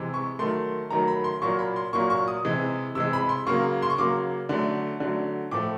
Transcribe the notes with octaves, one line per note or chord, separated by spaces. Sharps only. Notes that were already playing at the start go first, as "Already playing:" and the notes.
Already playing: C3 E3 G#3
C#6
D#3 F#3 A3 C6
D#3 F#3 A3 A#5
B5
C6
A#2 F#3 A#3 C#6
B5
C6
A#2 F#3 A#3 C#6
C#6
D#6
C3 E3 G#3
C3 E3 G#3 E6
B5
C6
C#3 F#3 A#3 C#6
C6
C#6
C#3 F#3 A#3 D6
D3 F#3 A3
D3 F#3 A3
A2 F3 A3 D6